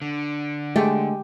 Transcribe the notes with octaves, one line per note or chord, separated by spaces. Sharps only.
D3
G#3 A3 G4